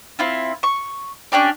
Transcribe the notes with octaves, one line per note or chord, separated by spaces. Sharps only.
C4 E4 F4
C#6
C#4 D4 G4 D5